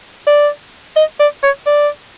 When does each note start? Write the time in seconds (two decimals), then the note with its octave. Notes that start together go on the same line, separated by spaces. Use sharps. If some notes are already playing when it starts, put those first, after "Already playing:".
0.27 D5
0.96 D#5
1.20 D5
1.43 C#5
1.67 D5